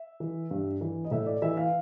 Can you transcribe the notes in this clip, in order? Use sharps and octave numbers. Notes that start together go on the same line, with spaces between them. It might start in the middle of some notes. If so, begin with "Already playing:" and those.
Already playing: E5
E3
G2
E3
D#5
A2 E5
D5
E3 E5
F5